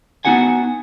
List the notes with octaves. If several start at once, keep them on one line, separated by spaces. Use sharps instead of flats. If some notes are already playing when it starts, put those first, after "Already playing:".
B3 D#4 F#4 F#5 G#5